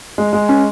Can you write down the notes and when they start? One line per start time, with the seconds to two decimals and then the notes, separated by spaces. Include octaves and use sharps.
0.18 G#3
0.33 G#3
0.49 C#4